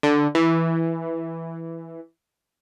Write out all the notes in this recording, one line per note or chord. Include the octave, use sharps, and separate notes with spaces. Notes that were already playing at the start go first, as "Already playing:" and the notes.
D3
E3